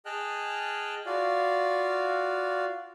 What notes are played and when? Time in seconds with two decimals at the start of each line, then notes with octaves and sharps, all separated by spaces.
0.06 G#4 D#5 G5 A5 F6 F#6
1.06 F4 F#4 D5 F5